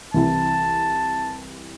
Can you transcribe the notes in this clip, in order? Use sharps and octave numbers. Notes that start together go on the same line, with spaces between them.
C2 C3 E3 A5